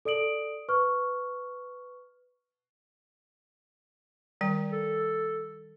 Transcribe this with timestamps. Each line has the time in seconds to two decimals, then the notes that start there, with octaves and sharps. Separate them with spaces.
0.05 A4 D5 D#6 D7 F#7
0.69 B4 C#6 F6
4.41 D#3 G3 G5
4.72 A4